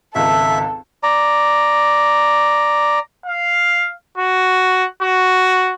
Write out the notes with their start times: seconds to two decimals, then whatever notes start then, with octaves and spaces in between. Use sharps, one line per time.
0.15 G#1 C#2 A4 E5
1.03 D5 A#5
3.26 F5
4.18 F#4
5.02 F#4